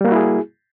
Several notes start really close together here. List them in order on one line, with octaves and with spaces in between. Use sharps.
G3 A#3 F#4 E4 G#4